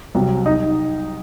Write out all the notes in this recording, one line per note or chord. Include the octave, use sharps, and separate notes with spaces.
C2 C3 F#3
D#4